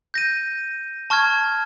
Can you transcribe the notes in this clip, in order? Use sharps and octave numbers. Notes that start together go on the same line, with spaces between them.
G6 A#6 D#7
A5 C#6 F6 G#6